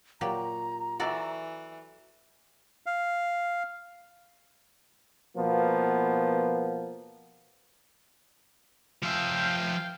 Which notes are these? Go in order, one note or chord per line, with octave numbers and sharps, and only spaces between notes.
A#2 F#3 G4 A#5
E3 F#4 A4 D5
F5
B2 F3 A#3 B3
F3 E5 F5 G5